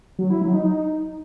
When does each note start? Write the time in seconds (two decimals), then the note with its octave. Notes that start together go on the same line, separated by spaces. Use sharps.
0.19 F#3
0.30 E4
0.42 F#3
0.53 D#4